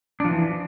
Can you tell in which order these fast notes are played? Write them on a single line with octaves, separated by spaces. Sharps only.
D4 F3 E3